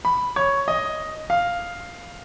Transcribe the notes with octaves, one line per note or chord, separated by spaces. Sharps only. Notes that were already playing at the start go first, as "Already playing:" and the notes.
B5
C#5
D#5
F5